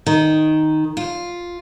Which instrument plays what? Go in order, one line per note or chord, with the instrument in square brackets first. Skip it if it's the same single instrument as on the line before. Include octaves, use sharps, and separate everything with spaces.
[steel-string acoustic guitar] D#3
F4